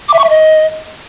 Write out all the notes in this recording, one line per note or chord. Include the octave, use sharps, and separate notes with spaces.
D6
E5
C#6
E5
D#5